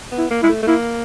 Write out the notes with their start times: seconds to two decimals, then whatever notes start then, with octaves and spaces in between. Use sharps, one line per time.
0.12 B3
0.18 E4
0.31 A#3
0.43 G#3 E4
0.49 A3
0.62 A3
0.67 A#3 E4